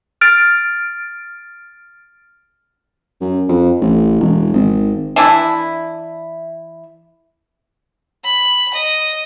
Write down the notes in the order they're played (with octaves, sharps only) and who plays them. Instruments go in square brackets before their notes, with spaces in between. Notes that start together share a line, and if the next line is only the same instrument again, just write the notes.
[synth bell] F6 A6 D7
[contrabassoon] F#2
F2
A1
E1
G#1
[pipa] E3 D4 E4
[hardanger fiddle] B5
D#5